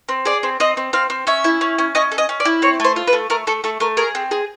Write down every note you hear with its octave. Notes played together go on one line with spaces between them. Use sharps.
C4
G#4 D5
C4
C4 D#5
C4
C4 F5
C4
C#4 E5
E4
C#4
C#4
C#4 D#5
A4
D#5
C#4
D5
E4
C4 C#5
A3 C5
F4
B4
A3
A3 A#4
A3 A4
A3 A4
A3 A#4
G#4 A#4
C4
G#4